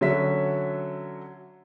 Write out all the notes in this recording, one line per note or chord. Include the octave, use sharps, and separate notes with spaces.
D3 F#3 C#4 E5 B6